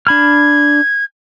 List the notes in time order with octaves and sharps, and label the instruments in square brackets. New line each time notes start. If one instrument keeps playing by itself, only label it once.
[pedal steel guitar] D4 B5 F6 [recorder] G#6